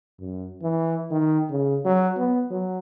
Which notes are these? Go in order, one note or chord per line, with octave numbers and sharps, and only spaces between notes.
F#2
E3
D#3
C#3
F#3
B3
F#3